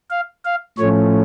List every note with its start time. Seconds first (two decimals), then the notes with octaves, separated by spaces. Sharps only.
0.10 F5
0.45 F5
0.78 A2 F3 A3 C#4 C#5